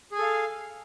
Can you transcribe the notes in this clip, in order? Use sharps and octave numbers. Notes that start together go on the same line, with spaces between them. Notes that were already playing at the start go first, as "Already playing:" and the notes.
G#4 A4 F5 G#5